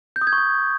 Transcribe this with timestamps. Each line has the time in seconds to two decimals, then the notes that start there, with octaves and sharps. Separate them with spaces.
0.16 G6
0.21 D#6
0.27 G#6
0.33 C#6
0.38 D#6